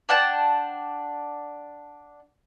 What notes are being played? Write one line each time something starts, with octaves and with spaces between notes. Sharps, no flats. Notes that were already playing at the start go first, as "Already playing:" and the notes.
D4 F#5 G5 A5